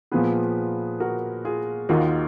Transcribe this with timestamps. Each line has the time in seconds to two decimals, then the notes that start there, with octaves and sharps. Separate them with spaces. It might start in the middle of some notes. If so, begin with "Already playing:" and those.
0.12 A#2 F3 B3 G#4 B4
1.00 F#4 A#4
1.45 F4 G#4
1.89 D#2 D#3 A#3 D#4 F4 F#4